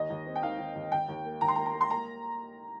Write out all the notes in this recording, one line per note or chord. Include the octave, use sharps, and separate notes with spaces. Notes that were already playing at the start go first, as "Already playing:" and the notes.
Already playing: D#2 D#5
D#2
C4
G5
D#3 F5
D#3
D#2
D#2 G5
D#2
A#3
D#2 A#5
C6
A#5
A#3
A#5
A#3
C6
A#3 A#5